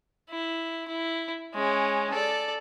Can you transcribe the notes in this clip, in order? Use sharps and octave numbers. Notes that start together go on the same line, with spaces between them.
E4
E4
G#3 C#4
A4 D5